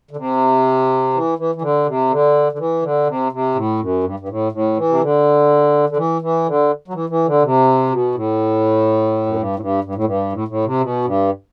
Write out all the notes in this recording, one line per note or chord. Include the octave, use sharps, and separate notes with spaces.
D3
C3
E3
E3
E3
D3
C3
D3
D3
E3
D3
C3
C3
A2
F#2
G2
G2
A2
A2
E3
C3
D3
D3
E3
E3
D3
F#3
E3
E3
D3
C3
B2
A2
F#2
G2
A2
G2
G2
A2
G2
A2
A2
C3
B2
G2